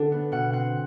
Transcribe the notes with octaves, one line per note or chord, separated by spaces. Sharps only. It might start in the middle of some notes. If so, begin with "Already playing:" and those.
Already playing: D3 D4 F#5
B3
B2 F#5
C4 F#5